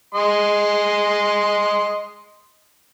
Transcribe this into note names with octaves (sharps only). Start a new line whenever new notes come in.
G#3 D#5 C6